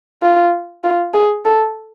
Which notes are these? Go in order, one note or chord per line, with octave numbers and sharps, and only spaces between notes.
F4
F4
G#4
A4